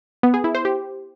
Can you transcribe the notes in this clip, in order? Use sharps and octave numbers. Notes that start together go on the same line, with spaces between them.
B3
G#4
E4
C5
G4